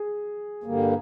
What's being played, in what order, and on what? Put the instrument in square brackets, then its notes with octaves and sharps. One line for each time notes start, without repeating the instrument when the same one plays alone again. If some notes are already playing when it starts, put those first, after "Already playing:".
Already playing: [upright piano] G#4
[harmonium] G2 D3 G3 A#3